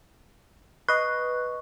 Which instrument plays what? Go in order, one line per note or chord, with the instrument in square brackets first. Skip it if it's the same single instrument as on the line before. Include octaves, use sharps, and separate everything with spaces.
[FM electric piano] B4 D#5 [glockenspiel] C#6 [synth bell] F#6